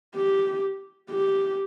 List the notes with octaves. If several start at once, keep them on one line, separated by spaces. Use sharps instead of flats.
G4
G4